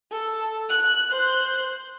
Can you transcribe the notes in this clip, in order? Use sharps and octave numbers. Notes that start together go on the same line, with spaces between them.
A4
F#6
C5 F#6